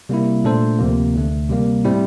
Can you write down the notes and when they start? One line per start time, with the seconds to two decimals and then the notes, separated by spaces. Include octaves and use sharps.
0.09 C3 G3 A#3 E4
0.44 A#2 A3 D4 A4 C5
0.79 D2 C3 F3 A#3
1.14 D2 D3 A3
1.49 C3 G3 A#3
1.85 A2 G3 C4 E4